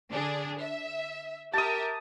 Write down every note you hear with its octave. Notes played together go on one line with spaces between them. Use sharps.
D3 D4 G#4
E5
G4 A#4 E5 A5 D#6